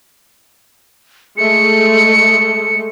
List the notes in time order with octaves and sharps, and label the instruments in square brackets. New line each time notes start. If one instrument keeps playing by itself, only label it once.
[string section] G#3 A3 [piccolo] C#7